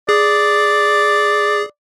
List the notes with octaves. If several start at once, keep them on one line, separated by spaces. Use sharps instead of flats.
G#4 D5